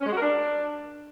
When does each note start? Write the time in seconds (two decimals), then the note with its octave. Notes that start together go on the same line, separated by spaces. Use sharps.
0.01 C#4
0.06 G#3
0.12 F#4
0.17 A#4
0.22 D4